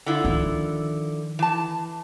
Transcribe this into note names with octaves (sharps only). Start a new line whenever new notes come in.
D3 E4 F4
D#3 F3
E3 A5